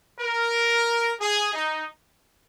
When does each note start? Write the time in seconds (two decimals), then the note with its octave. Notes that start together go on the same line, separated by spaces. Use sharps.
0.20 A#4
1.21 G#4
1.54 D#4